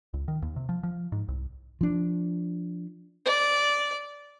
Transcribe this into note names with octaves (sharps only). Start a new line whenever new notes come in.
C#2
D#3
D#2
C3
F3
F3
G#2
C2
F3 D4
D5